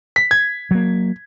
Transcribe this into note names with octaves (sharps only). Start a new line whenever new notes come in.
B6
G#6
F#3 A#3